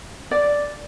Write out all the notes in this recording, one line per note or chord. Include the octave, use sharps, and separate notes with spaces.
D5